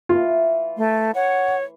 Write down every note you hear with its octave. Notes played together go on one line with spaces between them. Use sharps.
E3 A3 F4
A3 C6
C#5 F#5